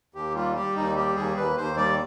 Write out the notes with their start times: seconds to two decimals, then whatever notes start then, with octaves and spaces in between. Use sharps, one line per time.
0.14 D#2 G4
0.35 G3 F4
0.56 G3 G4
0.76 D#2 D#4
0.96 G3 G4
1.16 D#2 G#4
1.36 D#2 B4
1.57 D#2 C5
1.77 G3 D5